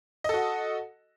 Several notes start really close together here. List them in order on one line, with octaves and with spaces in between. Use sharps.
D#5 A4 F#4